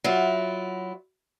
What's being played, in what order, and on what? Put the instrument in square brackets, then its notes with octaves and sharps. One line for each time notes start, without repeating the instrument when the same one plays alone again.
[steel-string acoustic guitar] F#3 E4 F4